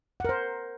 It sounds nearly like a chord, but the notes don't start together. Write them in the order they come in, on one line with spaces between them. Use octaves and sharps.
F#5 A#4 C5